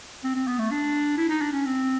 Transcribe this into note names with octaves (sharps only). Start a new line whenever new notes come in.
C4
C4
B3
A3
D4
E4
D#4
D4
C#4
C4